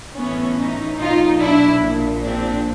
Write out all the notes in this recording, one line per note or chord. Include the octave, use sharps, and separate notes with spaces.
A1 A2 E3 B3 C#4
C#4 D#4
B1 B2 D#4 F4
D4 E4
A#1 A#2
C4 D4